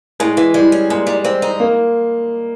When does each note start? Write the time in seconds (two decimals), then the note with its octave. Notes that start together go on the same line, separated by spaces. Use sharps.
0.20 A2 G#3
0.37 E3
0.54 G3 G#3
0.72 C#4
0.90 A#2 G#3
1.07 G3
1.25 C4
1.42 D#4
1.60 A#3